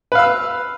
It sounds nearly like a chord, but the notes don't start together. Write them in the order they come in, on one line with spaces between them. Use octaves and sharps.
B4 F5 E6